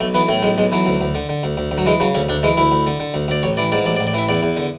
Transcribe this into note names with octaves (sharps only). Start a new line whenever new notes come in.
B1 A3
E3 B3
A2 A3
B1 G#3
B1 G#3
E3 F#3
D2
D2
D3
D3
D2
D2
D2
F#3
E3 G#3
C#3 F#3
D2 C#4
D2 D4
E3 G#3
D2 E4
D2
D3
D3
D2
D2 D5
A1 C#5
E3 D5
G#2 D5
A1 D5
D5
A1
D5
E3 E5
E2 D5
E2
D3